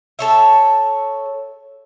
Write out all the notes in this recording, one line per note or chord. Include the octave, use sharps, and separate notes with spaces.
A4 C#5 E5